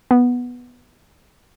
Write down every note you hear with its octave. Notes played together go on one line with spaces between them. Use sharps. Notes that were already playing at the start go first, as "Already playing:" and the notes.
B3